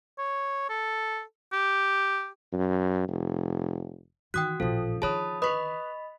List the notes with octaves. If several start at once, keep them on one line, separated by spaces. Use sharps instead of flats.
C#5
A4
G4
F#2
F1
D#3 E3 F#4 G5 D#6 F#6
A1 A#2 F3 A4
D3 D#3 G#4 C#5 A5 B5 D#6
B4 D#5 B5 C#6 D#6 B6 F7